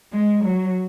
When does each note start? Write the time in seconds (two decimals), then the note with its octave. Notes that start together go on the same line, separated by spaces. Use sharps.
0.12 G#3
0.45 F#3